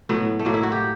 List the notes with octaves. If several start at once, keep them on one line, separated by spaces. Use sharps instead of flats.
A2 F#3 B3
A3
A2 F#3 A#3
E4
F#4
G4